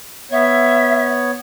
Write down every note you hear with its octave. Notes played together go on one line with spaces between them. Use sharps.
B3 C#5 E5